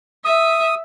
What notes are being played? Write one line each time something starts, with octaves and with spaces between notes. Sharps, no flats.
E5 D#6